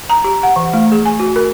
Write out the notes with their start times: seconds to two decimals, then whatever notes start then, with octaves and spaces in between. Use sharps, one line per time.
0.10 A#5
0.24 G4
0.43 F#5
0.56 E3
0.73 A3
0.92 G#4
1.05 G#5
1.19 F#4
1.36 A#4